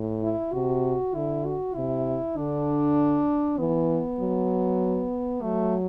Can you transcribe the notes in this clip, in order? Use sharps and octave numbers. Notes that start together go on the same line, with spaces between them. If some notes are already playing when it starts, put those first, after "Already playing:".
Already playing: A2
E4
C3 F#4
D3 E4
F#4
C3 E4
D3 D4
E3 B3
F#3
F#3 A3